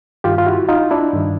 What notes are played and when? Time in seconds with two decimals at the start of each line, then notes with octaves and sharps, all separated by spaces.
0.24 G2 D#3 F4 G4
0.38 F4
0.47 E4 F#4
0.69 D#4 F4
0.91 D4 E4
1.13 G2 D#3